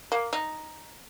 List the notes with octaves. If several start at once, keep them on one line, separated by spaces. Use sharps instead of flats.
A#3
D#4